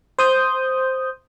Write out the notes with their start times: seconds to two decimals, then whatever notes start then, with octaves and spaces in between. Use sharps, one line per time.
0.19 C5 D#6 G6